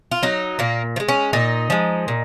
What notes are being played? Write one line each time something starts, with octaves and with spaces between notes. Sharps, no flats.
F4
F#3 D#4
A#2 A#3
F3
G#3
C#4
A#2 D#4
F3 G#3
A#2